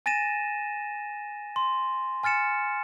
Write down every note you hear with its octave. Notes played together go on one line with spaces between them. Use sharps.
G#5 A6 A#6 D#7 E7
C6
G#5 F6 A6 C#7 E7